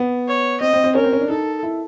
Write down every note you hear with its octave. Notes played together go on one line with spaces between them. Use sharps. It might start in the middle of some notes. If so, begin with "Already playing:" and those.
Already playing: B3
C#5
C4 D#5
C4
C4
C#4 A#4
C4
C#4
D4
D#4 A4
E4